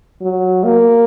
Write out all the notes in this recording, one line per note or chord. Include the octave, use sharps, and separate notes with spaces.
F#3
A#3